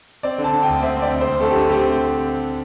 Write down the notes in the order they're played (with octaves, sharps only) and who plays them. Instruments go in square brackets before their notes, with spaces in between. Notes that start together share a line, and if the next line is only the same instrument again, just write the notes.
[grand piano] C4 D5
D3
A5
D3
G5
D2
C4 E5
C4
D5
D2
C5
D2
A3 A4
G4
D3
C4 G4